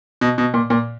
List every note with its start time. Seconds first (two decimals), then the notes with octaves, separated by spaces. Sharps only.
0.21 B2
0.38 B2
0.54 A#2
0.70 A#2